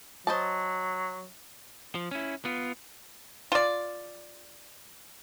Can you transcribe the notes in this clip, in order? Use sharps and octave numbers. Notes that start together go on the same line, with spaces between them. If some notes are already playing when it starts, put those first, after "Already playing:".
F#3 C5 D#5 A5
F3
C#4 E4
B3 F4
F4 D5